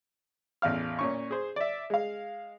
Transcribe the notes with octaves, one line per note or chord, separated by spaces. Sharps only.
A1 E2 F5 F6
A#2 C#4 C#6
G#4 C5
D5 E5
G#3 F5